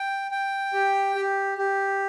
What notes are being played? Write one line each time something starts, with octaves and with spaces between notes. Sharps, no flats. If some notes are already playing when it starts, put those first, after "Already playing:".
Already playing: G5
G5
G4
G4
G4